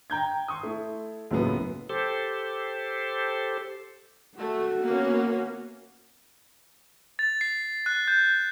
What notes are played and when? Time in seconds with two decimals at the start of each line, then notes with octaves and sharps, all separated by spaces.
0.10 G5 A#5 G6 G#6
0.48 C6 C#6 D#6
0.63 A3 E4
1.31 C#2 F#2 A2 F#3 A#3 B3
1.90 G4 A4 C5
4.38 A3 F#4
4.84 A#3 B3 C#4
7.19 A6
7.41 C7
7.86 F#6
8.08 G6